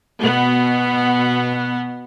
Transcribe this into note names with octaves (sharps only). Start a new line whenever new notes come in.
B2 B3